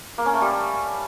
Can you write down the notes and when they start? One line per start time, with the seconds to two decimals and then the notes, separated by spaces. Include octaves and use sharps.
0.18 A#3
0.26 C#4
0.34 A3
0.41 G3